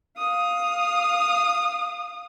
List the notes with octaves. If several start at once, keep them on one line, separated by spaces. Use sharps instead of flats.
F5 D#6